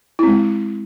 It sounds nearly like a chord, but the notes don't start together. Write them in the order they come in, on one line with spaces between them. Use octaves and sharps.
E4 C4 G#3